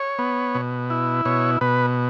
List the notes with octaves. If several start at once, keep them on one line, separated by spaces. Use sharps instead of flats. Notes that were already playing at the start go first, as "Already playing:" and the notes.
Already playing: C#5
B3
B2
E4
B2 C#5
B2 B4